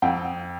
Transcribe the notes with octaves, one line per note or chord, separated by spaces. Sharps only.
F2 G5